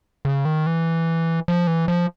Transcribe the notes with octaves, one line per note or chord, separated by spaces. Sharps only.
C#3
D#3
E3
F3
E3
F3